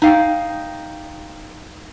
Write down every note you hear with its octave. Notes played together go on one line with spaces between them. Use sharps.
D#4 F5 G5